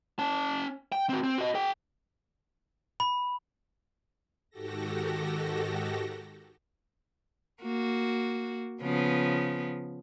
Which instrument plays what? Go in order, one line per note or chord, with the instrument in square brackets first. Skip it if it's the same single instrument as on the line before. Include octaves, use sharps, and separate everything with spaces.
[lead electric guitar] C#4 A5
G5
C4 F#4
C4
F#4 D#5
G#4 G5
[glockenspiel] B5
[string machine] G#2 D#3 F#4 G4 A4 A#6
[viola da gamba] A#3 F#4
C#3 F3 B3